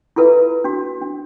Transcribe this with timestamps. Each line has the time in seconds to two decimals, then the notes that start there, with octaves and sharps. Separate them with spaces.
0.16 E4 F4 A4 B4 E5
0.64 D4 F#4
1.02 D4